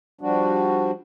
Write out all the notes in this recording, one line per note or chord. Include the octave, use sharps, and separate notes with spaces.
F3 G3 D4 F#4